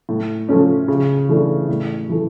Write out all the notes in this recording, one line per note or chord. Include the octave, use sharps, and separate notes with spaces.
A2
F3 A3 C#4
C#3
E3 A3 D4
A2
E3 A3